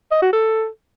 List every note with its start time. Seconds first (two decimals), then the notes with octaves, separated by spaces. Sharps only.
0.12 D#5
0.22 F#4
0.33 A4